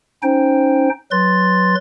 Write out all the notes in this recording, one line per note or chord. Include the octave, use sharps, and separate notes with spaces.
C#4 D#4 C5 G5
F#3 B4 C6 A6